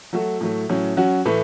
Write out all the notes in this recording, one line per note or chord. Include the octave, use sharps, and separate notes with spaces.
F#3 A3 F#4 A4
A2 F#3 A3
A2 F#3 C#4
F#3 C#4 F#4
A2 E3 A3 E4 B4